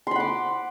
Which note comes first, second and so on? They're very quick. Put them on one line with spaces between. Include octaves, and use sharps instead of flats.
C6 B5 F#5 D6